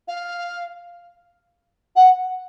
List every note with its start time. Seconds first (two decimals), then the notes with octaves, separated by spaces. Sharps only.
0.07 F5
1.95 F#5